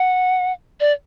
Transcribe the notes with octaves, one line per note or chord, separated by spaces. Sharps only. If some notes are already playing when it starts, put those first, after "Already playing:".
Already playing: F#5
D5